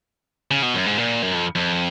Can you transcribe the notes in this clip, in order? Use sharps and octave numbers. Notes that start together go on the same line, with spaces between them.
C#3
B2
F#2
G#2
A#2
F#2
F2
F2